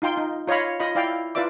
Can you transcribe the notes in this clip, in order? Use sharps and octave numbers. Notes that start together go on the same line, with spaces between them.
D#4 F4 G5 C6
D#4
F4 C#5 D#5 F5 B5
F4 D#5 B5
E4 D5 F5 G5
E4 F4 B4 D5 E5 D6